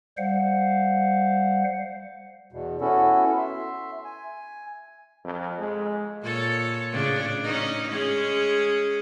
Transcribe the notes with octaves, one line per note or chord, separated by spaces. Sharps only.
G3 C5 F5 F#5
E2 B2
B3 C#4 E4 F#4 A4
E5 C6
G#5
F2
G#3
A#2 A4 C#5
A2 C#3 D4
C#4 D#4
G#3 C#4 G#4